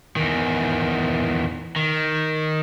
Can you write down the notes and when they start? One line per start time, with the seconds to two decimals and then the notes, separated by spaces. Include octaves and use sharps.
0.16 E2 D#3
1.76 D#3